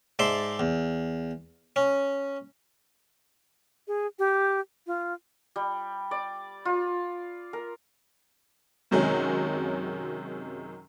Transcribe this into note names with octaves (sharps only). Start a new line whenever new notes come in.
G#2 D5 E5 A5 C6
E2
C#4
G#4
G4
F4
G3
D5
F4
A#4
F#2 C3 D#3 F#3 G#3 C#4